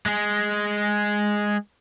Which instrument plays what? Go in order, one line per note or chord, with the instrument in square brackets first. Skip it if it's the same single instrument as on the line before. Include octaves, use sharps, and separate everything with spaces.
[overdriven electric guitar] G#3 G#4